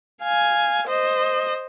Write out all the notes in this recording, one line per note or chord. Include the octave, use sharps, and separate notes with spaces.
F5 G#5
C5 D#5